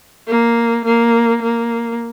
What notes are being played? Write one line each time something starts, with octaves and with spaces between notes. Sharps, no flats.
A#3
A#3
A#3